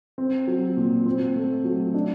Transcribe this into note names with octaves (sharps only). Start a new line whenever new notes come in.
C4
F#3
A#2
C4
A3
F#3
D4